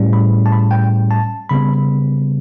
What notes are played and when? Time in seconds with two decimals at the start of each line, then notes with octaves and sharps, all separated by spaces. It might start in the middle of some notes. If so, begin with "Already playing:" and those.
Already playing: A2 G3 C#4
0.13 B5
0.46 A5
0.52 B5
0.71 G5
1.11 A5
1.49 C#3 G3 B3 B5